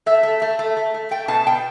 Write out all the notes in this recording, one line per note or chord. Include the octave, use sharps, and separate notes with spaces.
A3 E5
A3
A3
A3
A3
A3
A3 G5
B2 A5
B2 G5